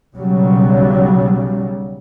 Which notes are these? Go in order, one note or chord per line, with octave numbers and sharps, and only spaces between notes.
B1 C#3 F#3 G3